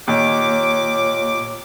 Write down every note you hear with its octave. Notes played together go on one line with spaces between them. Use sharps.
D#2 A#2 C#5 D6